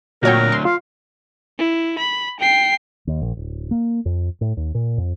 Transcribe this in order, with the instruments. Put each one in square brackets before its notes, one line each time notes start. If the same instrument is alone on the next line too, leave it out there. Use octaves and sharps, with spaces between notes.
[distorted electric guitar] D2 F#3 [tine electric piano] A#2 [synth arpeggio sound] F#4 C#5 G5 [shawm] A#4
[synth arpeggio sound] C6
[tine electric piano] F4 [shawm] F5
[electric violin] E4
B5
G5 C7
[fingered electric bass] D#2
A#1
D1
A#3
F2
A2
D#2
A#2
F2